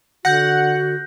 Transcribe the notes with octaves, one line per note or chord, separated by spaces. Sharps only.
D3 F#4 F#5 F#6 G6 A#6